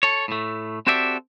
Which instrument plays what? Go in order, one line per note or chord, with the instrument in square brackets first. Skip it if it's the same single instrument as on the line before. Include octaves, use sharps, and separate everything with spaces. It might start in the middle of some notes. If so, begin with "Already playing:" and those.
[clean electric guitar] A4 C#5
A2 A3
C4 F#4 G4 A4 D5 E5